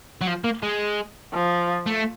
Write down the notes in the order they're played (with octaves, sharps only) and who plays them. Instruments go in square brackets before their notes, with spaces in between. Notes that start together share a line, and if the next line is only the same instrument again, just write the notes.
[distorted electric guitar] F#3
F3
A#3
G#3
[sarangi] F3
[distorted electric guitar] A3